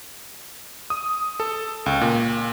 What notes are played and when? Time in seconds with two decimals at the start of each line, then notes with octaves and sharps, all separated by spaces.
0.90 D#6
1.40 A4
1.86 C#2
2.01 A#2